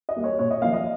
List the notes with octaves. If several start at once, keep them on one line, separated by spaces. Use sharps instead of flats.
D#5
G3 A#3
C#5
A#2 C#5
D#5
F3 A#3 F5
D#5